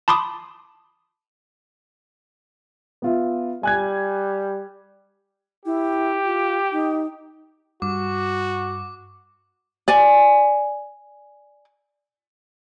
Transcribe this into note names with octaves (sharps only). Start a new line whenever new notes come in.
A5 B5 C6 D6 D#6
B3 F4 E5
G3 G#5 F#6 G#6
E4 G4
F4
D#4
G2 F#4 D6
D5 G#5